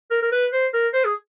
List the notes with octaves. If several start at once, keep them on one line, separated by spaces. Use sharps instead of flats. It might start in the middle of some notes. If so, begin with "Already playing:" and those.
A#4
A#4
B4
C5
A#4
C5
G#4